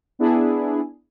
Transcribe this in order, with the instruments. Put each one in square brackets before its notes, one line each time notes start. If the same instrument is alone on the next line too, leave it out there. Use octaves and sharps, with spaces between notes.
[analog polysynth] B3 D4 E4 G#4